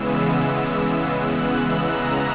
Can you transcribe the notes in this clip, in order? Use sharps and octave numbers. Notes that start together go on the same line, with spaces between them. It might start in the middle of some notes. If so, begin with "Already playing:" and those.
Already playing: C#3 E3 G#3 B3 E6
F#6
E6
A#5